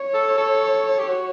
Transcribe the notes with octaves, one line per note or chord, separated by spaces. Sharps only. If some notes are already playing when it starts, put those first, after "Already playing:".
Already playing: C#5
A4
A4
G4
F#4